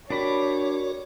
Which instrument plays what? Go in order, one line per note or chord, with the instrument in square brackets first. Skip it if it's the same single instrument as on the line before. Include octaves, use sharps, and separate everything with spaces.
[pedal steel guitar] D4 G4 B5 [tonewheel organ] F#4 A#4 D5 [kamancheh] C#5